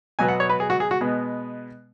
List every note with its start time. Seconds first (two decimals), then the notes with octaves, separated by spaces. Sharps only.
0.19 B2 F#3 B3 G#5
0.29 F#5
0.40 C#5
0.49 B4
0.60 G#4
0.70 F#4
0.80 G#4
0.91 F#4
1.01 B2 G#3 B3